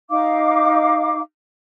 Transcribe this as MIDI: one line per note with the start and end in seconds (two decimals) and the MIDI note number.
0.10 1.20 63
0.10 1.20 77
0.10 1.20 86